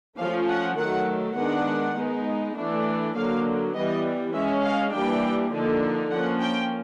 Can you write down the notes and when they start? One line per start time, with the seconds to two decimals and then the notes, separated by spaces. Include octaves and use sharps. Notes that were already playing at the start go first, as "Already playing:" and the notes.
0.18 F3 A3 C#4 F5
0.49 F#5
0.78 D#3 F#3 A3 F#5
1.37 D#3 G#3 B3 D4 F#5
1.96 G#3 B3 D#4
2.55 E3 A3 D4
3.15 D3 F#3 A#3 F5
3.74 E3 G3 B3 D#5
4.34 C#4 E5
4.38 G#3
4.64 F5
4.93 E3 G3 A#3 D4 G5
5.53 D3 F3 A#3 D#4
6.11 F3 A#3 C#4 F#5
6.41 G5